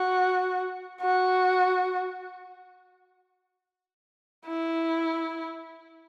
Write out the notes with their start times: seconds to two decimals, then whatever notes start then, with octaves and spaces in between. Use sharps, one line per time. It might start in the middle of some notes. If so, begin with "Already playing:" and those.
Already playing: F#4
1.01 F#4
4.48 E4